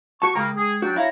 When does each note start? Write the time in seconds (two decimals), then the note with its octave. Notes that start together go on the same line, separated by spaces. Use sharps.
0.22 F#4 A5 C#6
0.35 C#3 G#3 A#3 G5 A#5
0.56 G#4
0.82 F#3 D4 F#4 G5
0.96 E4 C#5 F5 A#5